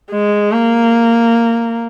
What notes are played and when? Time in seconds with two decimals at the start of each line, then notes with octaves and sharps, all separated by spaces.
0.11 G#3
0.52 A#3